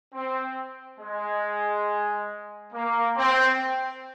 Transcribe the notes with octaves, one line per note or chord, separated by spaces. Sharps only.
C4
G#3
A#3
C4